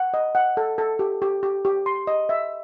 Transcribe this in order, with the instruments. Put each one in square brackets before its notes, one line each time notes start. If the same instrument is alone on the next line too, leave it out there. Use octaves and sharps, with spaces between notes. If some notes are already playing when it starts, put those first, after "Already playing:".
Already playing: [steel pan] F#5
D#5
F#5
A4
A4
G4
G4
G4
G4
C6
D#5
E5